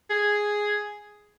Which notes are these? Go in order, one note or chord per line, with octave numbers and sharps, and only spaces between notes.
G#4